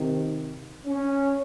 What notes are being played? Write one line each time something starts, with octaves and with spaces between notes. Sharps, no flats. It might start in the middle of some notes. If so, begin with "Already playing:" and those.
Already playing: C3 D#3
C#4